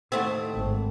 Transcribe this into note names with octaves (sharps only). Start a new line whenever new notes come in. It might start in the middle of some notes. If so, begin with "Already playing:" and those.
D#2 A2 A3 C4 C5 F#5
G#1